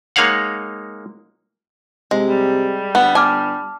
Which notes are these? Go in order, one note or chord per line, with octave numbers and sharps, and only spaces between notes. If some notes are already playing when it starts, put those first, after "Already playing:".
G#3 A#3 D#4 C#5 F5 F#5
C3 G#3
G3
G1 B3
G#5 A5 D6 F6